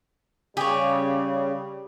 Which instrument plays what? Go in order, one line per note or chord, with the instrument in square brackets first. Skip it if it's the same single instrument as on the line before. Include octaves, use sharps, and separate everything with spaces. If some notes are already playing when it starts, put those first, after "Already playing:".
[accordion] C#3 [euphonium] G3 [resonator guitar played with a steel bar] G4 [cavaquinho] G#4 C#5